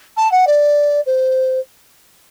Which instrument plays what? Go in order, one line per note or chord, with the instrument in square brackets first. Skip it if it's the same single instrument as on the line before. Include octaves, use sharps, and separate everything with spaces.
[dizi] A5
F#5
D5
C5